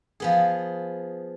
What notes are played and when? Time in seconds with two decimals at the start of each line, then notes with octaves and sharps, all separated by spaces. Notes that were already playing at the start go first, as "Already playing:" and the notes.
0.20 F3 B3 G#4